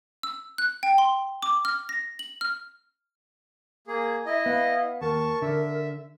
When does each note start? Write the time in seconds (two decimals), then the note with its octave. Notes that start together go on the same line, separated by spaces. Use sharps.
0.23 E6
0.58 F#6
0.83 G5
0.98 C6
1.43 D6
1.65 F6
1.89 A#6
2.19 F#7
2.41 F6
3.87 A#3 G#4
4.26 E4 D#5 E5
4.46 B3 F5
5.01 D#2 A#4 A5 C#6
5.42 D3 E5